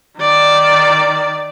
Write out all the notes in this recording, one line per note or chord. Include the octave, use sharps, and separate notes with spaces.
D#3 D5